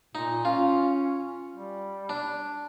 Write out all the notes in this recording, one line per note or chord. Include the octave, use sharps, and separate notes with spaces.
A#2 D#4
C#4 F4
G3
D4